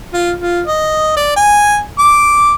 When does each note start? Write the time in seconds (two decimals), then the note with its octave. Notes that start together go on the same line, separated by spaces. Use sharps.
0.14 F4
0.41 F4
0.67 D#5
1.16 D5
1.36 G#5
1.99 D6